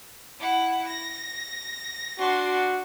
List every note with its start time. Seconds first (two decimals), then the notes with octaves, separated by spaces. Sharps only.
0.40 E4 F#5
0.88 A#6
2.19 D4 F#4 C6